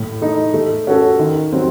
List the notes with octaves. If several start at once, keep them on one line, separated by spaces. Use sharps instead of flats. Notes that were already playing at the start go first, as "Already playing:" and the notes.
Already playing: A2
A3 D#4
A3
C#4 F#4 A4
D#3
F#3 C4